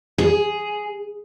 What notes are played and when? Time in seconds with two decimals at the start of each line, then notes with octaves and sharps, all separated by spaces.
0.18 G#4